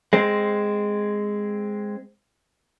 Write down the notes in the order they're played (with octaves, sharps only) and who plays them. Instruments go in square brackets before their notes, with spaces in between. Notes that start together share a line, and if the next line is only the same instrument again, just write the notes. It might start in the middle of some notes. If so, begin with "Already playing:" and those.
[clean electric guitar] G#3 C4